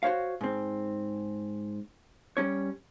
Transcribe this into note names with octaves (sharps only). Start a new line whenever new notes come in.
F#4 C5 C#5 F5
G#2 C4
G3 C#4 C#5